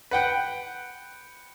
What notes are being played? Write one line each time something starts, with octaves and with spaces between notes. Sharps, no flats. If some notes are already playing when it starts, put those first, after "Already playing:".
B4 F#5 G5